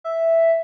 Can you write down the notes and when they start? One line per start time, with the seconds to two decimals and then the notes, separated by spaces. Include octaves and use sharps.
0.04 E5